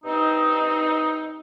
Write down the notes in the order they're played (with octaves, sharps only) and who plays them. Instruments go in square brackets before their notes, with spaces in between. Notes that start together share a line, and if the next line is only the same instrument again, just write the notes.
[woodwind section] G2 C4 D#4